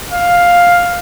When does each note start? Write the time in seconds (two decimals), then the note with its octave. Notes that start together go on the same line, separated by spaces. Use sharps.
0.12 F5